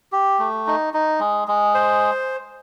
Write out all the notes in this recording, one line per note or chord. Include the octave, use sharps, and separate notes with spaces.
G4
A3
D#4
D#4
G#3
G#3
C5